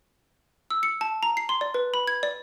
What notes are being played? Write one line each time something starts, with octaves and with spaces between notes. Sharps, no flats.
E6
C#7
A5
A#5
C7
C6
D5
B4
B5
G#6
D5